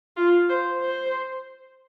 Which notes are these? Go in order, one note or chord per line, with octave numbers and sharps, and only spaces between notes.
F4
C5
C5